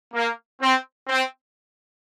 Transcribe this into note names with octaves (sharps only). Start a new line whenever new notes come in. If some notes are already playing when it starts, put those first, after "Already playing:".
A#3
C4
C4